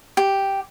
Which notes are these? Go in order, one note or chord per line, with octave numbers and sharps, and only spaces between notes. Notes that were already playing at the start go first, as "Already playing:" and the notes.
G4